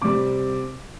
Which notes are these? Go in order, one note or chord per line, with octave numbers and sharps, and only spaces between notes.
C3 G3 C4 D6